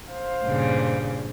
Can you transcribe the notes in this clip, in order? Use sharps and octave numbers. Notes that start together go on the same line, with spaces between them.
C5 F5
G2 A#2 C#3